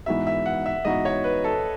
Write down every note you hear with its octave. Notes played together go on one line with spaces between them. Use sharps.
G#2 E3 B3 D#4 F#4 E5
E5
F#5
E5
G#2 E3 B3 D#4 F#4 D#5
C#5
B4
A4